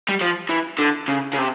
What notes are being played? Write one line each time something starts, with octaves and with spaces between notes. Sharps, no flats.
G3
F3
E3
D3
C#3
C#3
C3